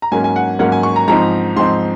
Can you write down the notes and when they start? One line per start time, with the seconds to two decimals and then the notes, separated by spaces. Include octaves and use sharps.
0.02 A#5
0.12 G#2 F#3 A#3 C#4 G#5
0.24 G#5
0.36 F#5
0.59 G#2 F#3 A#3 C#4 F#5
0.72 G#5
0.83 C#6
0.96 A#5
1.08 G#2 F3 C4 D#4 A#5
1.56 G#2 F3 C4 D#4 C6